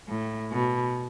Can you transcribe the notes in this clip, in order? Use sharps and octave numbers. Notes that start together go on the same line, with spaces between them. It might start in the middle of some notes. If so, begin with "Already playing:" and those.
A2
B2